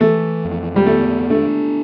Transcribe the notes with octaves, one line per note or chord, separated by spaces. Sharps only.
E3 A3
F2
G3
A3 B3
A3 D4